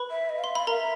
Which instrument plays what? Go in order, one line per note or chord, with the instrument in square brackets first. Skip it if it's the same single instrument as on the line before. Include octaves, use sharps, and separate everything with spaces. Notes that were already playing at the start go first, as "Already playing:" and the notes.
Already playing: [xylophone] B4 B5
[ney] E5
D#5
F5
[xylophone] C6
[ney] F5 [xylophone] B5
[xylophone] A#4 A#5 [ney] F5
[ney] E5